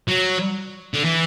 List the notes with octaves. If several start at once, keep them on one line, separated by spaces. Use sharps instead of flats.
F#3
D3
E3